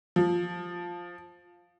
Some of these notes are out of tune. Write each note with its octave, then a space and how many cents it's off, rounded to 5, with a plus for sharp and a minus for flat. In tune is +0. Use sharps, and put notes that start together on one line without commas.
F3 +5